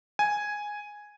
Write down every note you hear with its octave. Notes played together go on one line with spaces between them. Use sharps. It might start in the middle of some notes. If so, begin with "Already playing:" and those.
G#5